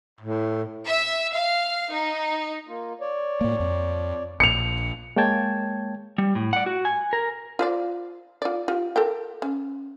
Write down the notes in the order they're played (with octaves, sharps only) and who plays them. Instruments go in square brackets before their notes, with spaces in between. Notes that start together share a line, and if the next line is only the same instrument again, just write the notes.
[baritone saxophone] A2
[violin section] E5
F5
D#4
[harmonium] A#3 F4
C#5 D5
[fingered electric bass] A2 A#3
F2
[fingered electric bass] A#1 [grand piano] C#7 F7
[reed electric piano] G#3 A#3 C#5 G5 A5 G#6
[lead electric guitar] G3
A2
D5 F#5
F#4
G#5
A#4
[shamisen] F4 C5 D5
F4 D5
F4 G4
A4 A#4 G5
C#4